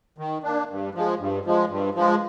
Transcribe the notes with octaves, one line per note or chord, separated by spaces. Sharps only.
D#3
A#3 D4
G2
F3 G#3
G2
F3 G#3
G2
F3 G#3